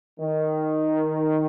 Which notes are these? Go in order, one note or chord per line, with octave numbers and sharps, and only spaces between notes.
D#3